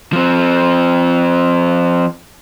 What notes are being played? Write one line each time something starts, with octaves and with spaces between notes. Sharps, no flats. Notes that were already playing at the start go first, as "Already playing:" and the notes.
F3 C4